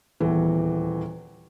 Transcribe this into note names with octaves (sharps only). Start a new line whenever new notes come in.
D#1 E2 E3